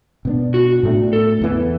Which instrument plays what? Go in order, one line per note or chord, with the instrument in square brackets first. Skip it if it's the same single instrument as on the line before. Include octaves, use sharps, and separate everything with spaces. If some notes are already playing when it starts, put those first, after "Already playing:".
[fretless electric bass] B2 B3 D4
[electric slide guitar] F#4
[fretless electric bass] A2 A3 D4
[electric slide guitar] A4
[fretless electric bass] E2 E3 B3